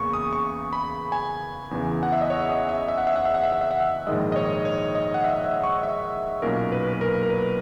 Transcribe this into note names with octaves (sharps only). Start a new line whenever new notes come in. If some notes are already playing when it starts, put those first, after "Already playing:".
Already playing: E2 C#3 E3 A#3 C#6
D#6
C#6
B5
G#5
E2 C#3 E3
F#5
E5
D#5
C#5
D#5
E5
E5
F#5
E5
F#5
E5
F#5
E5
F#5
E5
F#5
E5
A#1 G#2 D#3 G#3 D#5
D#5
C#5
C#5
D#5
F#5
E5
E5
C#6
E5
B1 A#2 F#3 A#3 C#4 A#4
B4
B4
A#4
A#4
B4